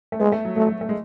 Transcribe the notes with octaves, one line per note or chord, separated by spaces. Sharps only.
A3
G#3 B3
A3
F#3
F#3 A3
F#3
A3
G#3